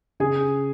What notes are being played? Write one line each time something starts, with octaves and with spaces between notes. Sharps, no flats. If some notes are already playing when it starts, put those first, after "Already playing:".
C#3 G#4 G#5